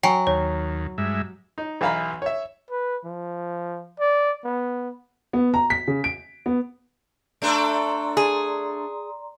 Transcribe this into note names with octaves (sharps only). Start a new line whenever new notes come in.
F#3 G5 G#5
D#2 C#5
G2 G#3 E5
D#4
B1 E3 E5 F5 A#5 B5
C#5 E5
B4
F3
D5
B3
B3
A#5
B6
C#3
D7
B3
A3 D4 A4 D5 A#5 C6
G#4